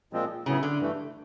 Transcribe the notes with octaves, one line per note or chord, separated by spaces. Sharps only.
A#2 F3 G#3 C4
A2 C#3 F#3 B3 E4
D3
G2 E3 A3